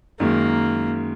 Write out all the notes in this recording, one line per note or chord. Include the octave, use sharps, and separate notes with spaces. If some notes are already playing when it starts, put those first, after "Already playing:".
F#2 D#3 G#3 A#3